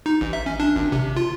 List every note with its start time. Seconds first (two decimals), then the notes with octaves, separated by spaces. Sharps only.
0.06 D#4
0.21 A1
0.33 E5
0.46 C#4
0.60 D4
0.76 G#1
0.92 C3
1.17 F4